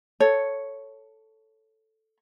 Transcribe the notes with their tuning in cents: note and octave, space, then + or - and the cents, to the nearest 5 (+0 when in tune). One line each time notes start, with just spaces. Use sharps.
A4 +0 C#5 +0